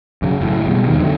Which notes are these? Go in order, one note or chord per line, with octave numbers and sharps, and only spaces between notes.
F#2 C#3 F#3
F#1 A2 E3
B2 G3 G#3
E2 D#3
D3 F#3 G#3 A3